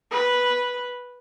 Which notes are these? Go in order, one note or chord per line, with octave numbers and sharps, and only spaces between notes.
B4